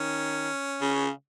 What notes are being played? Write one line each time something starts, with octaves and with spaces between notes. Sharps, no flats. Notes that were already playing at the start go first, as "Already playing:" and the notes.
Already playing: D#3 C#4
C#3